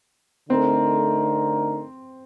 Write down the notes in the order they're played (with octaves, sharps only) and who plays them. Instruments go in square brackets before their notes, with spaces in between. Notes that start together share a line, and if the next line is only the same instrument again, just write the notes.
[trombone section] D3 A3 D#4 A#4 [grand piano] C4